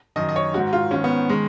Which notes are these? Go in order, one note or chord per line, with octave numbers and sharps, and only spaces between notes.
F#2 D#3 D#5
D#5
C#5
G#2 D#3 F#4
F4
G#2 D#3 C#4
B3
D#3 G#3